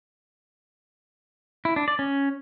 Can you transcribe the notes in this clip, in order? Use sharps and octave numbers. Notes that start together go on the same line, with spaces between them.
E4
D4
D5
C#4